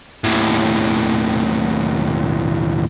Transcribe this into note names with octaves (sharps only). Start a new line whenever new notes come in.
D#2 A2